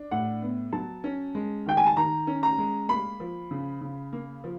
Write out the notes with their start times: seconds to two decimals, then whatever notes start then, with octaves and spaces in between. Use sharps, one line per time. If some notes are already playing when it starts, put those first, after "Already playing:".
Already playing: D4
0.11 A2 F#5
0.42 B3
0.73 F#3 A5
1.04 C#4
1.35 G#3
1.66 D#3 G5
1.77 G#5
1.87 A5
1.96 D#3 A#5
2.27 C#4
2.43 A#5
2.58 G#3
2.89 A#3 B5
3.20 F3
3.51 C#3
3.81 C#3
4.13 A#3
4.44 F3